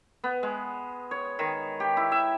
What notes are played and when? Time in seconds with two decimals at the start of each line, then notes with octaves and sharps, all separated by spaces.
0.24 B3
0.43 G#3
1.11 C#5
1.39 D#3
1.80 G4
1.97 E4
2.12 E5